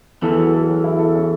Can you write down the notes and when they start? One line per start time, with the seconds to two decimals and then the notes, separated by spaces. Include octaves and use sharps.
0.22 E2 E3 A4
0.38 F#3
0.53 A4
0.69 F#3
0.84 E4
0.99 A4
1.15 C#4